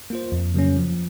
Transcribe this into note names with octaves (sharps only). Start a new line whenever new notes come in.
A#3 F4 C5
F2
C#3 F#3 A#3 C#4
F3